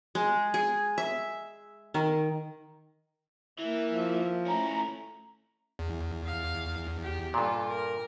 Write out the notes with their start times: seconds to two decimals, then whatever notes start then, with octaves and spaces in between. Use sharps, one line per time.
0.15 G#3
0.54 G#4
0.98 E5
1.94 D#3
3.59 E3 A#3 E5
3.89 F3
4.46 A3 C#4 E4 A#5
5.79 E2
6.25 F5
7.02 G4
7.34 G2 A#2 F4 A4
7.68 A#4